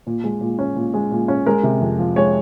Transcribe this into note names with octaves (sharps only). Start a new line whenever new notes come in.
A#2
G#3
A#2
C#4
A#2
G#3
A#2
C#4
G#3 A#4
C3
F2
F3
G#3 C#5